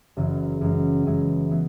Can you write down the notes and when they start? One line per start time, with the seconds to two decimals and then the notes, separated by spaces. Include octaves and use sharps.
0.17 F#1 F#2 C#3 E3
0.61 F#2 E3 G#3 C#4
1.06 F#2 E3 G#3 C#4
1.51 E3 G#3 B3